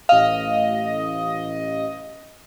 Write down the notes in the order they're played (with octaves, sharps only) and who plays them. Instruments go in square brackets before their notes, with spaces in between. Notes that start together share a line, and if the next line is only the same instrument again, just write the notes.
[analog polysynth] A1 D#5 [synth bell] F5